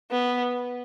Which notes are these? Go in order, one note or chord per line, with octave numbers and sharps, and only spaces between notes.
B3